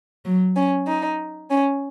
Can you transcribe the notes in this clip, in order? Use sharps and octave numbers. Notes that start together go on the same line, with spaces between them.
F#3
C#4
D#4
C#4